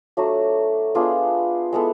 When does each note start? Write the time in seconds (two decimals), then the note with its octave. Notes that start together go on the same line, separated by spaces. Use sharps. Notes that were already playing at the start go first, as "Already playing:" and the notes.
0.17 F#3 A3 D4 F#4
0.95 B3 D4 F4 G#4
1.73 G#3 B3 E4 A4